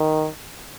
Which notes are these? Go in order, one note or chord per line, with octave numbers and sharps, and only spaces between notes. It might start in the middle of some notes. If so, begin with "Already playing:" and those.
Already playing: D#3